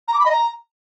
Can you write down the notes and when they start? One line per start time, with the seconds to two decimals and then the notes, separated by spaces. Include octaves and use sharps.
0.08 A#5
0.14 D6
0.20 B5
0.26 D#5
0.31 A#5